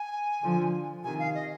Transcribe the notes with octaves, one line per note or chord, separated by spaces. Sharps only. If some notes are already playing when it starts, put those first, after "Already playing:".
Already playing: G#5
D3 F3
C3 D#3 G#5
F5
D#5